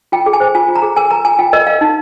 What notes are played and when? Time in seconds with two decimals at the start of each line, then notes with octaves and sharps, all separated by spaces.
0.12 F4 G5
0.26 G#4
0.33 G#5
0.40 C5
0.55 F4 G#5
0.68 F4
0.76 A#5
0.82 G#4
0.96 A#4 G#5
1.11 A#4 A#5
1.25 F4 G#5
1.39 F4 G5
1.53 A#4 D#5
1.67 A#4 F5
1.81 D#4